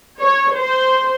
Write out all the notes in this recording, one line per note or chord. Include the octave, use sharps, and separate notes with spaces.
C#5
C5